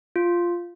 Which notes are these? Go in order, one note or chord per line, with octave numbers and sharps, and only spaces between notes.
F4